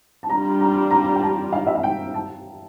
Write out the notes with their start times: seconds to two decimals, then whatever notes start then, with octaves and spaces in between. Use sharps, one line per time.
0.23 A5
0.30 G3 D4 F4 A#5
0.60 A#5
0.91 A#5
1.15 G5
1.22 A5
1.53 F5
1.67 E5
1.75 F5
1.83 G5
2.14 A5